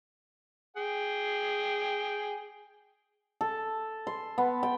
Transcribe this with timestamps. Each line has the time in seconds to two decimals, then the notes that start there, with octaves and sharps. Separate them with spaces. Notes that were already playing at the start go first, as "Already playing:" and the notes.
0.77 G#4 G5
3.41 A4
4.07 C6
4.38 B3
4.63 G5